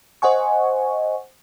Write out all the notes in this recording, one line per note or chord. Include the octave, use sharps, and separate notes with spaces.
C5 D#5 F#5 G#5 C#6